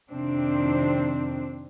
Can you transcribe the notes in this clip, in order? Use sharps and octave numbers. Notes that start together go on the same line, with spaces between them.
F2 C3 D#3 C4 D4